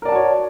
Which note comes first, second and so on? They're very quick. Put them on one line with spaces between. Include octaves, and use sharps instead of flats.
A#4 D5 A5 F#4 C#5